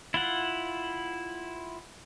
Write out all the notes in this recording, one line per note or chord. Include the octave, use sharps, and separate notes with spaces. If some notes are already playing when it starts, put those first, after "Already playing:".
E4 F4 F#5